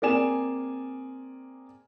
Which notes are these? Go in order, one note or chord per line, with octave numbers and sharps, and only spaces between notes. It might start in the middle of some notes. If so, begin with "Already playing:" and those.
A#3 C4 G#4 D5 G#5 E7